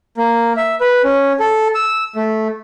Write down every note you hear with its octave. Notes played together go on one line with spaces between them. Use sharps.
A#3
E5
B4
C#4
A4
E6
A3